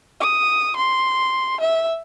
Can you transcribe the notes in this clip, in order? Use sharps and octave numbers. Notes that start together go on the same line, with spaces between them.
D#6
C6
E5